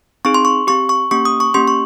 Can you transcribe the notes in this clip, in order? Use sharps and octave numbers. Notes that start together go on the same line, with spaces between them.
C4 D#4 G#4 C#6
C6
C#6
C4 G4 C#6
C#6
A#3 C#4 G4 C#6
D#6
C#6
A#3 C#4 G4 C6
C#6